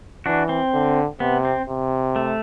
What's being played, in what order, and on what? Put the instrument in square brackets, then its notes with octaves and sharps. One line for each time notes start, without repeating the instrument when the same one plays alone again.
[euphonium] E3 [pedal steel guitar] D4 F#4
[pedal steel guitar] C4
[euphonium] D3
[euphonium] C3 [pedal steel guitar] B3
[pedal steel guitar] C4
[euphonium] C3
[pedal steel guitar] A3